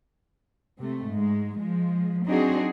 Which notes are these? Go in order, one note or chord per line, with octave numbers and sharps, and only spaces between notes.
C3 A3
G#2 G#3
F3 G#3
F#3 C4 D4 D#4 F#4 G#4